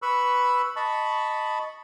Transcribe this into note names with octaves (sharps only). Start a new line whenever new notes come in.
B4 B5 C#6 E6
D#5 A5 B5 C#6